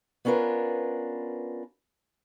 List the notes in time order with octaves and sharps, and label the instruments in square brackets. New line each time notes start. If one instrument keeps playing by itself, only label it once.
[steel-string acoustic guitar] B3 C#4 D4 F4 A#4 B4